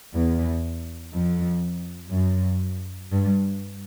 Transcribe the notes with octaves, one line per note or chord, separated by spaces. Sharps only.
E2
F2
F#2
G2